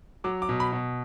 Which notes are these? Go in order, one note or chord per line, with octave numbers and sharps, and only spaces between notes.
F#3 D6
D6
B2
B5
B2